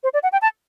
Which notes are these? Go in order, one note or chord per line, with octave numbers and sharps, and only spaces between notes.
C5
D5
F#5
G5
A5